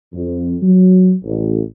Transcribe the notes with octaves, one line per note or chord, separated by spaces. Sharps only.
F2
F#3
A1